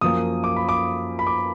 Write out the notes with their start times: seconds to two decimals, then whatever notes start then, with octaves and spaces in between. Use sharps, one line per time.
0.01 F#2 F3 A#3 D#6
0.44 D6
0.56 B5
0.69 D6
1.19 B5
1.27 D6